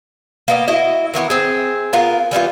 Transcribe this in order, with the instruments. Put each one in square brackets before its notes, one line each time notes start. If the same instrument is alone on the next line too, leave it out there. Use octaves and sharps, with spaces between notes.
[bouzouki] A#3 B3 D#5
E4 F#4 D#5
D#3 E3 B3 E4
C4 G#4
B3 F4 A#4
E3 G3 B3 F4